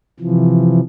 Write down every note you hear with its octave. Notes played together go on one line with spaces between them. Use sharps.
C3 E3 F3